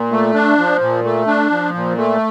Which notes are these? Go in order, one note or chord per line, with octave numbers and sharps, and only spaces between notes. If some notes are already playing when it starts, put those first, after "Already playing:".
Already playing: A#2
A3
D4
F3
A#2
A3
D4
F3
A#2
A3